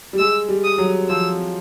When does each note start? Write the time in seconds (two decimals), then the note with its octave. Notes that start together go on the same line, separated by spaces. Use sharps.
0.13 G3
0.19 G#3 E6
0.48 G3
0.64 D#6
0.78 F#3
1.09 F3 E6